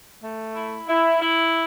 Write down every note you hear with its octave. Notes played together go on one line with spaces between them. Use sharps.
A3
E4
E4
E4